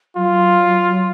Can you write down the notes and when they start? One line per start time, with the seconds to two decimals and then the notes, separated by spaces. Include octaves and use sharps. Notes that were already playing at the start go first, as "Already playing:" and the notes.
0.17 F#3 F4